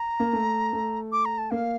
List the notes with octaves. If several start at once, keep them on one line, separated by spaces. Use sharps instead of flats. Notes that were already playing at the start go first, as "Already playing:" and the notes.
Already playing: A#5
A#3
A3
A3
D6
A#5
A5
A#3 F5